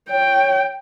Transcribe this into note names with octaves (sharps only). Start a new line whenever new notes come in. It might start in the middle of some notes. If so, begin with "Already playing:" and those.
C#5 G5